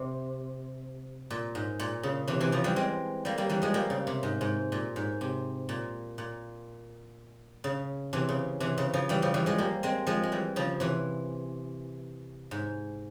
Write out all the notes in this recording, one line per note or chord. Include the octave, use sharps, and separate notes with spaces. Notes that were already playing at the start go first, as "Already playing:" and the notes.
Already playing: C3
A#2
G#2
A#2
C#3
C3 E3
C3 E3
C#3 F3
E3 G3
G#3 C4
G3 A#3
G3 A#3
E3 G3
F3 G#3
G3 A#3
C#3
C3
G#2
G#2
A#2
G#2
C3
A#2
A#2
C#3
C3 E3
C#3
C3 E3
C#3
C#3 F3
E3 G3
C#3 F3
E3 G3
F3 G#3
G3 A#3
G#3 C4
F3 G#3
G#3
E3 G3
C#3 F3
C3 E3
G#2